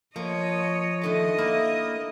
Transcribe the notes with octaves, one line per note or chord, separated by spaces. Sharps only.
F3 A#3 C#5 D#5
D3 D#3 A3 D#5
A#3 E4